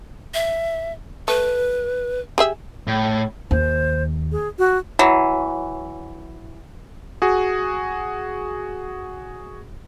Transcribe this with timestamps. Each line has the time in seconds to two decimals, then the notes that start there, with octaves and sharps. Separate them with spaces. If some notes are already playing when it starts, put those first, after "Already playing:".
0.34 E5
1.28 A3 B4
2.38 G4 G#4 E5
2.87 A2
3.51 D#2 C5
4.32 G#4
4.59 F#4
4.99 E3 F#3
7.22 F#4 G#4